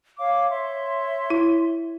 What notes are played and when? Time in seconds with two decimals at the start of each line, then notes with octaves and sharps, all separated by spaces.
0.18 C#5 F5 D6
0.50 C#5 E5 C6
1.30 E4